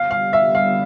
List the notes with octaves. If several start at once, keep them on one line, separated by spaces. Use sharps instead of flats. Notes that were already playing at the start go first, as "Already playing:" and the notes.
Already playing: D3 G3 B3 F5
F5
E5
F5